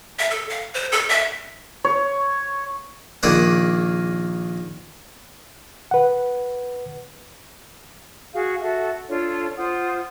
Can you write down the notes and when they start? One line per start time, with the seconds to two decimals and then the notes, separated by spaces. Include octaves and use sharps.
0.19 E5
0.31 A4
0.49 F5
0.74 C5
0.92 A4
1.09 E5
1.85 C#5
3.23 A#1 D#3 A#3 G#4 D5 F#5
5.91 B4 F#5
8.34 F#4 G#4 F5
8.62 F#4 A4 E5
9.08 D4 F4 A4 C#5
9.57 F4 C5 F#5 D#6